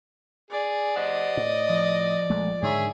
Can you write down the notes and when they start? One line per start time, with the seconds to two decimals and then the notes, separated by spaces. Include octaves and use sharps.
0.51 G#4 D5
0.96 G4 C5 D#5 F#5
1.37 A2
1.69 F3
2.30 A#1 G#3 A3
2.62 G#2 D3 D#3 G#4 C#5 E5